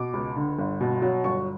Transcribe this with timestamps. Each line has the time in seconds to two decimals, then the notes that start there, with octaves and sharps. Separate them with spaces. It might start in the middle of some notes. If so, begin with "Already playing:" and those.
Already playing: B2 D6
0.13 C#2
0.36 D3
0.59 G1
0.81 B2
1.02 F#3
1.24 G1 C#6